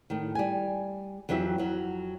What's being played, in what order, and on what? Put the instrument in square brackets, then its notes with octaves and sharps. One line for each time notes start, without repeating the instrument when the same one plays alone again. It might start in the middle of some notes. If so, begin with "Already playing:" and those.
[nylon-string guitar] A2 D#3
G3 G#5
F2 E3 F#3 G4 E5
F2 F#3